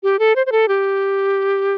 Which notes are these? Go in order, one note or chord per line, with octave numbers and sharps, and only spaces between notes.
G4
A4
C5
C5
A4
G4